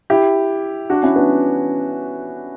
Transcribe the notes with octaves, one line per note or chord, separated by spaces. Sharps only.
E4 G4
D4 F#4
C#4 E4
B3 D4